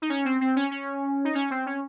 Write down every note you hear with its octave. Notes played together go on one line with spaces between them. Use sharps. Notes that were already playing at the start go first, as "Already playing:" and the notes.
D#4
C#4
C4
C4
C#4
C#4
D#4
C#4
C4
C#4